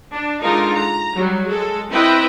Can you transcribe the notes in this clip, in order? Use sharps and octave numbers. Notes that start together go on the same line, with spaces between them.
D4
D3 G#3 D#4 F4 A#4
A#5
F#3 G3
G#3 A4
C4 E4 B4 D#5 G5 B5